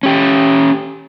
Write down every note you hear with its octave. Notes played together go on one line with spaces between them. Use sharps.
C#4 G4